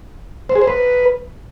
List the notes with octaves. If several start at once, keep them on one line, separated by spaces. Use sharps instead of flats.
C5
G#4
C5
B4